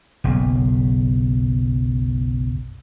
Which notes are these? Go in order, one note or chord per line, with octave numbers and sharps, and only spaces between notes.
F#1 B1